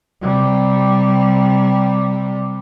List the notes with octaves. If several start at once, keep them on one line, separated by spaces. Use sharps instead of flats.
C3 G3